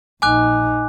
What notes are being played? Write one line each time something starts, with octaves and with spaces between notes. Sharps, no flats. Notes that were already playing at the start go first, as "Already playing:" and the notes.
A#1 D#4 G#5 D6 F#6